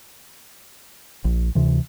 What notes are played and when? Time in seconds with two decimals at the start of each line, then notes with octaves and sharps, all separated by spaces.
1.25 A#1
1.55 D2 C3 E3